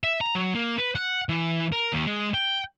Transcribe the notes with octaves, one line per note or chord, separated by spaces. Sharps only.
E5
A#5
F#3
A#3
B4
F#5
E3
A#4
D#2
G#3
G5